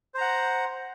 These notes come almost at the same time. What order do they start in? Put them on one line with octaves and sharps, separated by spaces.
C5 A#5 F#5